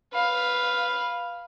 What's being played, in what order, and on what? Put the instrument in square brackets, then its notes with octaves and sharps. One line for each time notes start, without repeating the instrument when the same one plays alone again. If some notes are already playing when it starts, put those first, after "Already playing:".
[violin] B4 F5